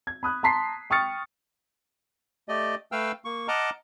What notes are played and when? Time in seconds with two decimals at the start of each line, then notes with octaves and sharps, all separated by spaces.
0.07 G#6
0.23 B5 D#6 F#6
0.43 A5 A#5 C6 B6 C7
0.90 G5 C#6 D#6 F6 A6 C#7
2.49 A3 G4 D5 D#5
2.92 A3 B4 F5 G5 E6 F6
3.25 A#3 C#6
3.48 D#5 F#5 A5 A#5 D6 F6